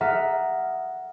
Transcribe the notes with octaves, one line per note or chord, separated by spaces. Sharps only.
A4 E5 F#5 A#5 D#6 F6